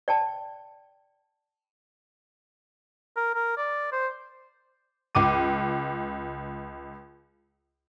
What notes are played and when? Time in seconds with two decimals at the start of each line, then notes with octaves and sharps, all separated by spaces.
0.08 D5 G5 A5
3.17 A#4
3.35 A#4
3.57 D5
3.92 C5
5.15 C#2 D6 D#7